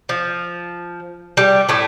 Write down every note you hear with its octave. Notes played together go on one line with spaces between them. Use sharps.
F3
G3
A2 A3